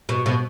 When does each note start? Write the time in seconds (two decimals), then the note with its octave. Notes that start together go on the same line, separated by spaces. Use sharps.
0.09 B2
0.26 B2